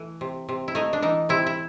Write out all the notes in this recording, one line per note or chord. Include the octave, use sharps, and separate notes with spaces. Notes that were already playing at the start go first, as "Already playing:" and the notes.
Already playing: E3 A3
C3
C3
E4
A3 D#4
D4
E3 D#4
C3 E4
E4